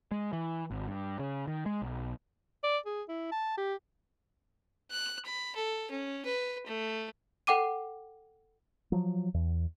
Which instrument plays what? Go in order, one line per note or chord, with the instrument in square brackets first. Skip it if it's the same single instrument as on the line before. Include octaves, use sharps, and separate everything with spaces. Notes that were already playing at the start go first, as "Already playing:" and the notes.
[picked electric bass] G#3
E3
G#1
G2
C#3
D#3
G#3
B1
[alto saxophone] D5
G#4
E4
A5
G4
[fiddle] F#6
B5
A4
C#4
B4
A3
[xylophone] A4 F#5 G5 D6 D#7
[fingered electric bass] F3 F#3
E2